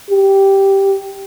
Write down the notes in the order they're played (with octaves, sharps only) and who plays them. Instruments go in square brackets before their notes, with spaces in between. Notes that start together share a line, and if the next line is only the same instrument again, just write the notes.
[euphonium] G4